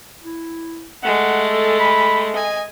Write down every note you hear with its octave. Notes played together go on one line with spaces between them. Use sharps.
E4
G#3 A3 F#5
A4
B5
D#5 G#5